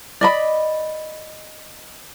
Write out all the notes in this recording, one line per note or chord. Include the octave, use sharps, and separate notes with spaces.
D5 D#5 B5